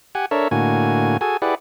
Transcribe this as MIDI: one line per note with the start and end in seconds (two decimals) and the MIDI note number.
0.15 0.26 67
0.15 0.26 78
0.15 0.26 80
0.31 0.48 62
0.31 0.48 69
0.31 0.48 70
0.31 0.48 73
0.31 0.48 76
0.51 1.17 45
0.51 1.17 50
0.51 1.17 58
0.51 1.17 66
0.51 1.17 80
1.21 1.37 66
1.21 1.37 68
1.21 1.37 69
1.21 1.37 80
1.42 1.55 64
1.42 1.55 67
1.42 1.55 68
1.42 1.55 71
1.42 1.55 74
1.42 1.55 78